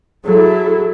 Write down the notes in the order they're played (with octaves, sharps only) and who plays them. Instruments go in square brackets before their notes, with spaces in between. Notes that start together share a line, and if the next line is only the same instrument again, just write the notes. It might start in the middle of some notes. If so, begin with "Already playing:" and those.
[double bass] F#3 [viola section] E4 A4 [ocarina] G#4